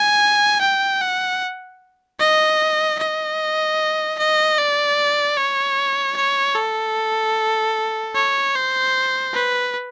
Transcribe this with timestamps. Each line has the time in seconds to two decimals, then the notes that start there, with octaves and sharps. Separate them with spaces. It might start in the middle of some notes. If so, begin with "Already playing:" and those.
Already playing: G#5
0.61 G5
1.01 F#5
2.19 D#5
2.99 D#5
4.19 D#5
4.58 D5
5.37 C#5
6.16 C#5
6.56 A4
8.15 C#5
8.55 C5
9.34 B4